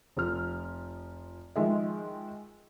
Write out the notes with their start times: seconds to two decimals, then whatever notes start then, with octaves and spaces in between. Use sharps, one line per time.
0.17 F1 F3 F6
1.56 D#3 F3 G#3 E5